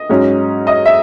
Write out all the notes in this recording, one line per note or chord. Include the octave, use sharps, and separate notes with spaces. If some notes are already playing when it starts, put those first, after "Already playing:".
Already playing: D#5
G#2 F#3 C#4
D#5
E5